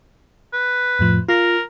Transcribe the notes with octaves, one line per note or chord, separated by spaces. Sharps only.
B4
F2 A2 F3
F4 A#4 A#6